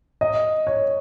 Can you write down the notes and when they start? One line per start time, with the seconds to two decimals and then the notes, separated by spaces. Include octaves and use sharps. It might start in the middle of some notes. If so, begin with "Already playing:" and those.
0.21 D#5
0.67 C#5